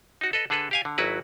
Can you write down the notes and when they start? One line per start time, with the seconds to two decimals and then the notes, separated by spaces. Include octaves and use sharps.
0.21 D#4 F#4
0.33 A4 B4 D#5
0.50 D3 G#4 A4 B4
0.71 G4 F5 G#5
0.85 D3
0.98 G#1 F#3 E4 F#4 B4